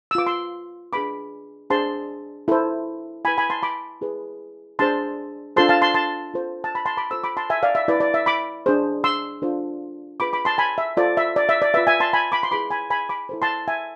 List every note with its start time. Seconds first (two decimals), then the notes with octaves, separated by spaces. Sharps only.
0.11 E6
0.15 F4 B4 D6
0.27 C6 E6
0.93 D4 G#4 B4 B5 D6
1.70 D4 G#4 C5 A5 C6
2.48 E4 A4 C5
3.25 E4 B4 G#5 B5
3.38 G#5 B5
3.50 A5 C6
3.63 B5 D6
4.01 E4 G#4 B4
4.79 D4 G#4 C5 A5 C6
5.56 D4 F4 A4 C5 A5 C6
5.69 F5 A5
5.81 A5 C6
5.94 A5 C6
6.34 F4 A4 C5
6.64 A5
6.75 B5
6.86 A5 C6
6.97 B5 D6
7.11 F4 A4 C5 C6 E6
7.24 B5 D6
7.37 A5 C6
7.50 E5 G#5
7.63 D5 F5
7.75 E5
7.88 E4 B4 D5
8.00 D5
8.14 E5
8.26 B5 D6
8.66 D4 G#4 C5
9.04 C6 E6
9.42 D4 F4 A4 C5
10.20 F4 G#4 B4 B5 D6
10.33 B5 D6
10.45 A5 C6
10.58 G#5 B5
10.78 E5
10.97 F4 A4 C5 D5
11.17 E5
11.36 D5
11.49 E5
11.62 D5
11.74 F4 B4 E5
11.87 E5 G#5
12.00 A5 C6
12.13 G#5 B5
12.32 B5 D6
12.43 C6
12.51 E4 G#4 B4 B5 D6
12.70 G#5 B5
12.90 G#5 B5
13.09 B5 D6
13.29 E4 A4 C5
13.42 A5 C6
13.68 E5 G#5